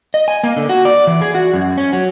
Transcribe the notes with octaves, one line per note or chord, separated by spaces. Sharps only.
D#5
G#5
A#3
D3
F#4
D5
E3
G#4
F#4
F#2
C#4
F#3